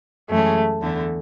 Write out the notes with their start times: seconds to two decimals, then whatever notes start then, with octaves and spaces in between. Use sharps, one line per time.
0.30 F#2 E3 G#3 A3 C#4 G#4
0.80 E2 D3 A3